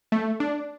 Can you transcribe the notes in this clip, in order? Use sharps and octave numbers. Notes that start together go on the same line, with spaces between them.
A3
D4